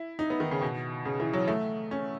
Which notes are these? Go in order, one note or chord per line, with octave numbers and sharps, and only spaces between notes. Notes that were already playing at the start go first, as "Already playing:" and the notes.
Already playing: E4
D#4
B3
D#3
C#3
B2
C#3
E3
F#3
A3
C#4